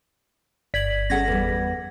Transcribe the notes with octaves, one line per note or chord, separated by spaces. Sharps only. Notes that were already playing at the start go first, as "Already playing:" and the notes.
G1 D5 G#6 B6 F#7
C#4 G#4 A4 F#5 G#6 A#6
E2 G3